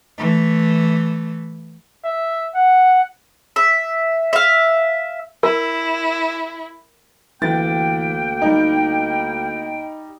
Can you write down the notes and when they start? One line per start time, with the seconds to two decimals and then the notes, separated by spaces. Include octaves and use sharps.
0.18 E3 A3
2.05 E5
2.55 F#5
3.56 E5
4.33 E5 F5
5.43 E4 A#4
7.42 D2 E3 A#3 G5 A6
8.42 G3 D#4